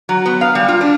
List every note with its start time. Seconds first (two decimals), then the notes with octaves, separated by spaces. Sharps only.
0.09 F#3
0.26 B3
0.41 F5
0.55 G3
0.68 F4
0.81 D4